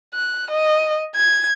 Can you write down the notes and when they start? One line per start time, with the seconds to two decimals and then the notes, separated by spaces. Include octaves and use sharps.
0.14 F#6
0.51 D#5
1.16 G#6